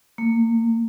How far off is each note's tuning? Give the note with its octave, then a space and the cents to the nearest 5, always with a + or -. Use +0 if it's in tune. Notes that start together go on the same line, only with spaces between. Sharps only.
A#3 -30